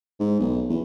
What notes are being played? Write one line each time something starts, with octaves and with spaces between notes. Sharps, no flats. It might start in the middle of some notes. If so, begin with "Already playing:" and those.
G#2
B1
E2